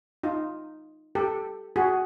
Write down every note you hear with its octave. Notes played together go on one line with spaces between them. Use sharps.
D#4 F4
G4 A4
F#4 G#4